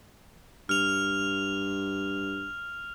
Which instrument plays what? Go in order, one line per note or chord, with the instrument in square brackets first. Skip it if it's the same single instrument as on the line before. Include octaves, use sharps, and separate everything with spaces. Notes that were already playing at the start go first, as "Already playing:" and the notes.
[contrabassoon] G2 [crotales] F6 F7